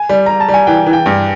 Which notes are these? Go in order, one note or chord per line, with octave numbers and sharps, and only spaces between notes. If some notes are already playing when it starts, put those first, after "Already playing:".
Already playing: G#5
G3
G3 A#5
A5
G3
G#5
E3 G5
E3
G5
G2